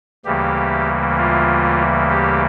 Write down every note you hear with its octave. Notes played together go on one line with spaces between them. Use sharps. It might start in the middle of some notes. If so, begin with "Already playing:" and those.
D2 C#3 E3 G3 A#3 G4
F4
G4